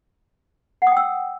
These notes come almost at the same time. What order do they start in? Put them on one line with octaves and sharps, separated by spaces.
F#5 D#6 G5 E6